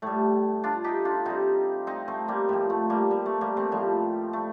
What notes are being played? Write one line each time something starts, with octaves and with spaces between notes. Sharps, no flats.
A2 G3 A3
D4 F4
D#4 G4
D4 F4
C3 G3 C4 D#4
C4 D#4
A3 C4
G3 A#3
A2 F3 G3
A3
G3 A#3
G3
A3
G3 A#3
A3 C4
A2 F3 G3
A3